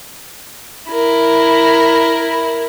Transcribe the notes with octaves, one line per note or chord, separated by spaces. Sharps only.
E4 A#4